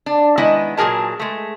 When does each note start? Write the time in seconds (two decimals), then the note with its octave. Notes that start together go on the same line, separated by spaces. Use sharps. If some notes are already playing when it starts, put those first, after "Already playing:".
0.06 D4
0.38 D#3 G#3 B3 E4 D#5
0.77 A#2 F#3 G#4 A#4 A5
1.20 G#3 A3